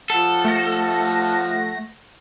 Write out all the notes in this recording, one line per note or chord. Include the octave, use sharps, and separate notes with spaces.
F3 A4 F#5
A3 A#6